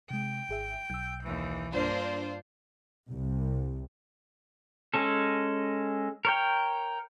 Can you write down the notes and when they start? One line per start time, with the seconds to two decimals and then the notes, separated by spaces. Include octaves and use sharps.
0.10 C3 G#3 G5
0.49 G#1 G#4 E5
0.90 B1 E6 G6
1.23 D#2 E3
1.73 G2 A#3 D4 F4 C5
3.09 C2
4.94 G#3 C#4 A4
6.25 A#4 C#5 G5